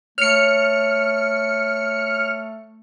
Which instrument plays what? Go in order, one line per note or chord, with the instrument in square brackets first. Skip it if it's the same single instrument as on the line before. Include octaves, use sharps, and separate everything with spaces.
[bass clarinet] A3 [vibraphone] C#5 [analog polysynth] F6 C#7